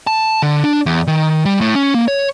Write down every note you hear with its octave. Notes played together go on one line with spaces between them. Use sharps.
A5
D3
D4
E2
D#3
G3
A2
C#4
A#3
C#5